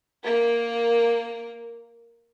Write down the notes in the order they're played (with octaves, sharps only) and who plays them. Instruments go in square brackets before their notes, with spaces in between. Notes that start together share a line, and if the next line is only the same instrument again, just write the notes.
[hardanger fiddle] A#3 A#4